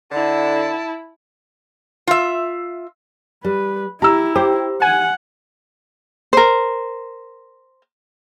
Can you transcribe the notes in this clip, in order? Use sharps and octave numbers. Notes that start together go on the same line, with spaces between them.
D3 E4 A5
F4 E5
G3 B4
E4 G4 A#5 E6
G4 C5
F#5 G#5
A#4 C5